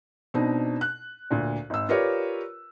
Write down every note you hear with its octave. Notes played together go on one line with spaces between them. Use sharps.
B2 C4 D4 D#4
F#6
D2 A#2
G#1 E6
F4 G4 A#4 B4 C#5 D5